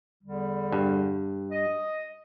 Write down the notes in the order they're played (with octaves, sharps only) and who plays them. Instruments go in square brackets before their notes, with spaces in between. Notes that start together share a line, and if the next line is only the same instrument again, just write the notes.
[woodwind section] E2 D3 G3
[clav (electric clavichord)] G2
[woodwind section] D#5